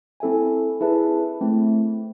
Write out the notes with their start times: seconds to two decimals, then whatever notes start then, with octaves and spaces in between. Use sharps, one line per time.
0.20 C4 E4 A4 E5 G#5
0.81 E4 G#4 B4 E5 A5
1.41 A3 C4 E4